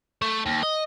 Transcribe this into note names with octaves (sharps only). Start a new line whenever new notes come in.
A3
D#2
D#5